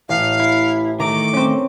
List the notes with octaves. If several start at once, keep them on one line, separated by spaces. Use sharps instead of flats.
A1 F5
E4
D#3 A3 A#5 D6
C4 C#4